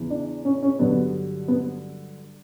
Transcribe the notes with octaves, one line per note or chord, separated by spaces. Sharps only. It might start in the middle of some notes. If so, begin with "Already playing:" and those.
Already playing: E2 C#3 E3
D4
C#4
C#4
G2 D3 F#3 B3
B3